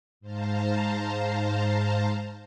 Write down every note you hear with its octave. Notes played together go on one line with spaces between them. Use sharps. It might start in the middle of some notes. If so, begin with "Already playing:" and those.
G#2 C5 F5 A5 A#5